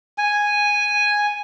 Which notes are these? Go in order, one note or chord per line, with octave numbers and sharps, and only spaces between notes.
G#5